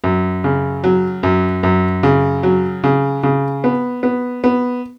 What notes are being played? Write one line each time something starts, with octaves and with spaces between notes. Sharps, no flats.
F#2
C#3
F#3
F#2
F#2
C#3
F#3
C#3
C#3
B3
B3
B3